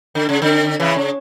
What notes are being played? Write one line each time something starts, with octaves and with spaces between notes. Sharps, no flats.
D3
C#3
D3
C#3 E3
C#3